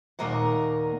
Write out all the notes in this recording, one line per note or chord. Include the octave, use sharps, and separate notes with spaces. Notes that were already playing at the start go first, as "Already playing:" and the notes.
D#2 A#2 A#3 A#4 D#5 F#5